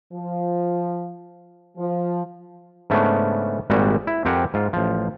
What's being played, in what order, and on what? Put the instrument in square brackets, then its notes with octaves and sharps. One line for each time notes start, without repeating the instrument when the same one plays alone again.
[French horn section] F3
F3
[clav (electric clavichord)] G#2 C#3 A3 B3 C#4 D4
G#1 A#2 G3 G#3 F#4
E4
F2 C4 G4 A#4 F#5 G#5
G#2 F4
A1 F3